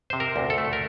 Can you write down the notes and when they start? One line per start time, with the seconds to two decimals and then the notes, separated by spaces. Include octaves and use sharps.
0.10 C3 C5
0.20 A#4
0.36 D2
0.50 A4
0.58 A3
0.73 A#4